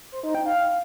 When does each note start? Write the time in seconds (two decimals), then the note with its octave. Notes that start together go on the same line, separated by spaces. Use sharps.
0.12 C5
0.23 D#4
0.35 G5
0.46 F5